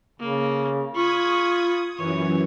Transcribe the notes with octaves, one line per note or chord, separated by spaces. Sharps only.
C#3 A#3
F4 B5 C#6 D#6 G#6
F#2 E3 C#5